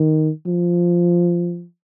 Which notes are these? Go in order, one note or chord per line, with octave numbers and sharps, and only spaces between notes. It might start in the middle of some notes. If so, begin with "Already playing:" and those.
Already playing: D#3
F3